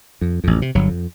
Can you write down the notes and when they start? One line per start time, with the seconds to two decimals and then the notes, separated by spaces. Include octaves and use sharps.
0.21 F2
0.44 A1 F2
0.62 C3
0.75 G1 F#3
0.89 F2